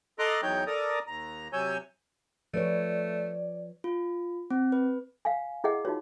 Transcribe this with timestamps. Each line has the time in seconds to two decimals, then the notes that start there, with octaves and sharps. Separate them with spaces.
0.19 A4 D#5 A#5 C6 D6 F#6
0.43 E2 F#3 D#4 C#5 G5 G6
0.67 A4 A#4 D5 A#5 D#6
1.07 D#2 A#5
1.53 C3 F#3 C#5 G#5 E6 G6
2.54 F3 A3 B4 C#5 D5
3.84 F4
4.51 C4
4.72 B4
5.25 F5 F#5 G#5
5.64 E4 G#4 D#5 F#5
5.85 D#4 F4 F#4 C#5